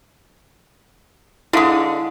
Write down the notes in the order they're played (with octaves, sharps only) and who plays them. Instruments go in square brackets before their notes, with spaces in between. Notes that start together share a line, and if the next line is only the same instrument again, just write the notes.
[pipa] D3 G#3 [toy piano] E4 F5 D#6